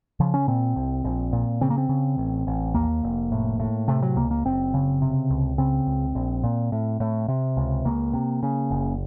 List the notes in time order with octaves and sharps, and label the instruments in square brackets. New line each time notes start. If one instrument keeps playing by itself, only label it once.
[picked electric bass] C#3 F3
C#4
A#2 C4
C2
A#1
A#2
C#3 C4
A#3
C4
C#3
A1
A1
D#2 A#3
F1
A2
A2
C3 A3
F#3
C#2 A#3
A#3
F#1 C4
C#3
C3
C#2
C#3 C4
C#2
A#1
A#2
A2
A2
C3
C#2
C#2 A#3
C3
C#3
F#1